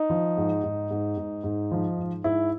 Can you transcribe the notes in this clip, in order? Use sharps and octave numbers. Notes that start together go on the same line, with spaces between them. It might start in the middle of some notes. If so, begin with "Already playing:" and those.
Already playing: D#4
F3
G#2
G#2
G#2
G#2
G#2
F3
G#2
G#2 E4